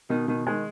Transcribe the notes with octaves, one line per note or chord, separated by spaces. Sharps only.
B2 D#3
B2 D#3
D#3 G#3